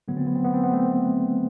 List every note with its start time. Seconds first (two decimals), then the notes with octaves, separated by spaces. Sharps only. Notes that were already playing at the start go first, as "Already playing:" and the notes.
0.08 D3 F#3 A3 B3
0.17 C4
0.26 B3
0.36 C4
0.44 B3
0.54 C4
0.63 B3
0.73 A3 C4